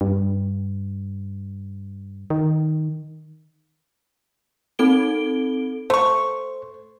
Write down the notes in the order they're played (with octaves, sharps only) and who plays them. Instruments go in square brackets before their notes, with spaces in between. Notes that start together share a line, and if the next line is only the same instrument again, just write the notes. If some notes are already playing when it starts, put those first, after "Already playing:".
[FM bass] G2
D#3
[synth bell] C4 D#4 A4 D7 G7
[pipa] A3 C#6 [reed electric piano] C5